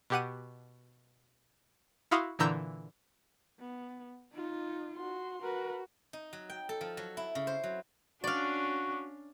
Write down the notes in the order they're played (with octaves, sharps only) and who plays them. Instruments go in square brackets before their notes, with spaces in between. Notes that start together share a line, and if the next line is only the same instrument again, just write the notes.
[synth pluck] B2 G4 F#5 D#7
E4 F#4 F5 C6 D#6
A#2 D3 E3 A#5 E6 G6
[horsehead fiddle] B3
D#4 F4
[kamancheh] F#4 C6
[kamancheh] F#4 [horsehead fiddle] A#4 B4
[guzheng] D#4
F#3
G5
A4
F3
F#3
E4
C#3
C5
F#3
[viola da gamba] C#4 D4 [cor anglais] F#4 [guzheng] D5 F5